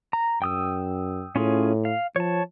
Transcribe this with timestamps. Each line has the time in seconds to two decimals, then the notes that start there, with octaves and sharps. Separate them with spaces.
0.13 A#5
0.42 F#2 G5 D#6 E6
1.36 A2 C#4 F4 G#4
1.85 F5
2.16 F3 C#5 A5